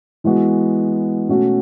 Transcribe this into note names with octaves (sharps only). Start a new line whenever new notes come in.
E3 G#3 B3 F#4
B2 A3 C#4 F#4